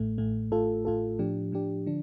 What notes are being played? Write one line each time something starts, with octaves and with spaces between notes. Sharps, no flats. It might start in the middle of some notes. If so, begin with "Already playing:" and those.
Already playing: A1 A2 A3
A1 A2 A3
A1 A2 A3 F4 A4
A1 A2 A3 F4 A4
A2 F3 D4 G4
A2 F3 D4 G4
D3 F3 D4